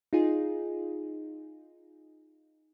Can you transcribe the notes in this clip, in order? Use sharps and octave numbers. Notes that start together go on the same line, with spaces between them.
D#4 F4 G#4